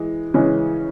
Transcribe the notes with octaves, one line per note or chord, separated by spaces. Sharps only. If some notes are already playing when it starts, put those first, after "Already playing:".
Already playing: E3 G#3
C#3 E3 G#3 C#4